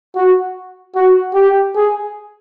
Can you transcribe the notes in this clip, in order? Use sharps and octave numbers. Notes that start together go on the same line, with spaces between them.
F#4
F#4
G4
G#4